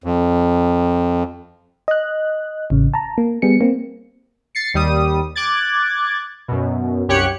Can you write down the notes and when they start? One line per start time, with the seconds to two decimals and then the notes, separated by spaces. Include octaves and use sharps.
0.04 F2
1.88 D#5 F#6
2.70 A1 C#3
2.94 A5 A#5
3.18 A#3
3.42 G3 B3 G#4 C#7
3.61 A#3 C4
4.55 A6 C7 C#7
4.74 D#2 G3 D#6
5.36 D6 F#6 G#6 A6
6.48 F#2 B2
7.08 C2 F#2 G4 C#5 F#6 C#7